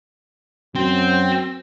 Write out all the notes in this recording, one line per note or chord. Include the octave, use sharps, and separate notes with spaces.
F#2 C4